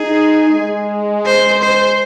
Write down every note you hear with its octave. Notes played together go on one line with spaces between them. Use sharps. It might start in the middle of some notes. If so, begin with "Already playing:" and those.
Already playing: D#4 G#4
G#3
C5
C5